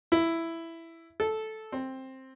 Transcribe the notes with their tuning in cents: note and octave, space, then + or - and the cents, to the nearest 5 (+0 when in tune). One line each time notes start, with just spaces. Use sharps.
E4 +5
A4 -10
C4 +10